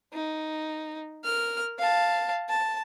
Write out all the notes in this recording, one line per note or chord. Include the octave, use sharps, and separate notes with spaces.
D#4
A#4 F6
F5 A5
A5